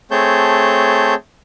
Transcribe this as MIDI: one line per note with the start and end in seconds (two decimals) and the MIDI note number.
0.11 1.14 57
0.11 1.14 60
0.11 1.14 68
0.11 1.14 73
0.11 1.14 81
0.11 1.14 91